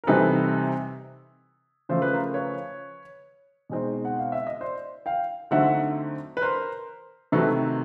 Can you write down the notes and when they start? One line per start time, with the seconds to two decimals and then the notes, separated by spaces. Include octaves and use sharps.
0.04 A#4
0.07 C3 E3 G3 C4 D#4 A4 B4
1.89 C#3 F3 A3 C5
2.02 B4
2.13 A#4 C5
2.34 B4 C#5
3.70 B2 G#3 C4 D#4
4.05 F#5
4.19 F5
4.32 E5
4.47 D#5
4.60 C5 D5
5.06 F5 G5
5.51 D3 F#3 A3 C4 D#4 E5 F#5
6.37 B4
6.42 A#4 C5
7.32 C3 D#3 F#3 A3 A4 B4